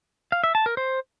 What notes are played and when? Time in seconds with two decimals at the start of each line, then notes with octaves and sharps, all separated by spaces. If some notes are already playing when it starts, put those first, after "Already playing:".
0.32 F5
0.44 E5
0.55 A5
0.66 A#4
0.77 C5